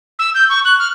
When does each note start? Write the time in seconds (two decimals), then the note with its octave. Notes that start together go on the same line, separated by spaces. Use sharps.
0.19 E6
0.35 G6
0.50 C#6
0.65 F#6
0.79 F6